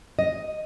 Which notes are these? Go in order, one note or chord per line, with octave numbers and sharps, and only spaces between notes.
D#5